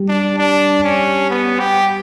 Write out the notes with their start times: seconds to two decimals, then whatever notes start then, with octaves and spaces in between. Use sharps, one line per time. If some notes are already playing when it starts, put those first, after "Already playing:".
Already playing: G3
0.09 D4
0.39 D4
0.84 C#4
1.30 B3
1.60 G4